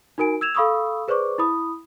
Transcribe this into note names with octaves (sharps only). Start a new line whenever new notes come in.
D#4 F#4 A#4 G#5 D7
E6 G#6 E7 F7
A4 F5 B5 C#6 D#6 E6
G#4 B4 C5 D5 C#6 D6
E4 B5 D#6